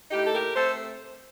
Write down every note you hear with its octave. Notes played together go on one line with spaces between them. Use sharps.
A2 D#4 G4
A4
G4 A#4
A3 C4 A4 C5